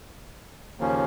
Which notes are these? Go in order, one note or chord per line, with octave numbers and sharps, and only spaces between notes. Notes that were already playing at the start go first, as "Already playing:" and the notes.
D#2 C#3 F3 A#3 C#4